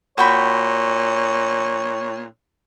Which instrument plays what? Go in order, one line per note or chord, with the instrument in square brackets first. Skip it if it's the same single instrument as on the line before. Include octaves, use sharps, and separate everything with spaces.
[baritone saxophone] A#2 [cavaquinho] F#4 G5 B5 [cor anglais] C#5